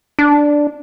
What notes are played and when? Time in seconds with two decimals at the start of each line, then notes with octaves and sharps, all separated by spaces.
0.19 D4